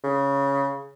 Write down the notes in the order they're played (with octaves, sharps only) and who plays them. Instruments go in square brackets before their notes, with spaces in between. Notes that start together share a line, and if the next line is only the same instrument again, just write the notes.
[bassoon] C#3